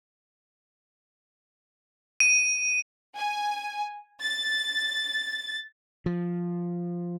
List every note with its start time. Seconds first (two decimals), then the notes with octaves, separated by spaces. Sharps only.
2.20 D#7
3.15 G#5
4.21 A6
6.06 F3